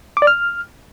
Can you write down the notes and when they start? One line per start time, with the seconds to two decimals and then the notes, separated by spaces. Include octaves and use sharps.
0.17 D6
0.22 D5
0.27 F6